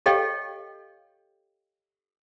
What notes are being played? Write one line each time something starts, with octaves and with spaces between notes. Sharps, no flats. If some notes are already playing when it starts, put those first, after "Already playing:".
G4 A4 C#5 D#5 F5 G5